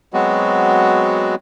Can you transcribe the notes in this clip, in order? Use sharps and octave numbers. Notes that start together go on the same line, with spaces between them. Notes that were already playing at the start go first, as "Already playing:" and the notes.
F#3 G#3 B3 C4 F#4